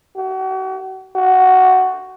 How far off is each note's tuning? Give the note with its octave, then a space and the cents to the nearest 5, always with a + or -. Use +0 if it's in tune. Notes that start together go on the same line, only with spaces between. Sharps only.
F#4 +40
F#4 +10